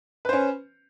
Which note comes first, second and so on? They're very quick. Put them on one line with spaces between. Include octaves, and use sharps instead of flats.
B4 C5 C#4